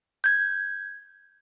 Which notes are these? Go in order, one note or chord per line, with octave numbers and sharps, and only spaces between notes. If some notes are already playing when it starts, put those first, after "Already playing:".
G6 G#6